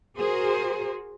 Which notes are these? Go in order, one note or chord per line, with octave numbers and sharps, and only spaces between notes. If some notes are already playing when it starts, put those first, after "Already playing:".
F#4 G#4 A#4 C5